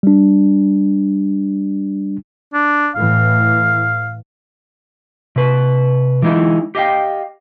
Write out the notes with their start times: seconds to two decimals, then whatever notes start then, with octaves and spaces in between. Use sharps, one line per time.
0.03 G3 D4
2.54 D4
2.95 A2 E3 F5
5.36 C3 B4
6.22 E3 G#3 D#4 E4
6.75 G4 D#5 F5 G5